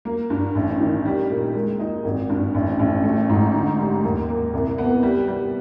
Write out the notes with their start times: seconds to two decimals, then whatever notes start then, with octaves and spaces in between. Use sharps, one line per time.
0.05 A#3
0.30 G2
0.55 A1
0.80 D#3
1.05 G3
1.30 A#2
1.55 G#3
1.79 D#4
2.05 G#1
2.30 G2
2.55 A1
2.79 A1
3.04 A3
3.29 G#2
3.54 D3
3.78 G3
4.04 D#2
4.29 A#3
4.54 C2
4.78 B3
5.03 G3
5.28 G3